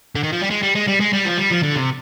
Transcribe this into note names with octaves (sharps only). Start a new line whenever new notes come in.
D3
D#3
F3
G3
G#3
G3
G#3
G3
G#3
G3
F3
G3
F3
D3
C3